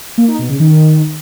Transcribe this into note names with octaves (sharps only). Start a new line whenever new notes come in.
A#3
D#4
B2
C#3
D#3